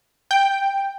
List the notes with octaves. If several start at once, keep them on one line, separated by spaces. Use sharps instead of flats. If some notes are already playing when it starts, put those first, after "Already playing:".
G5